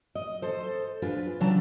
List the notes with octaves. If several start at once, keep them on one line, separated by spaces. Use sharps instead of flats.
D#5
A4 C5
D4 F4 G#4 B4
C#3 E3 F#3 D4 A5 A#5